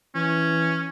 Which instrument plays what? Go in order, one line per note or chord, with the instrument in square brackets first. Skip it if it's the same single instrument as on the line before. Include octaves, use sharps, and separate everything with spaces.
[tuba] E3 [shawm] C#4